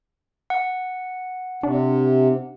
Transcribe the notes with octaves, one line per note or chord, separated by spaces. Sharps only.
F#5
C3 D4